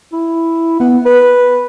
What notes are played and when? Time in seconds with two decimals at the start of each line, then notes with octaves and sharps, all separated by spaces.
0.13 E4
0.80 B3
1.05 B4